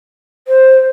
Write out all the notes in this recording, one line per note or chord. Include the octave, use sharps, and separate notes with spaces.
C5